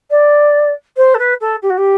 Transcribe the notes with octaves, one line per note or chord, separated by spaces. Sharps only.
D5
C5
A4
B4
A4
G4
F#4
G4